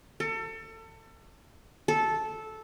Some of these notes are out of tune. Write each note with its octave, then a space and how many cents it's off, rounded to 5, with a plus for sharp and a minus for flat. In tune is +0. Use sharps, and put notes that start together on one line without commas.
A4 +30
A4 -10